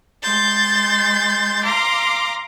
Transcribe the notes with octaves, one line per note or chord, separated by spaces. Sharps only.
G#3 C6 G6 A6
F5 A#5 C6 D6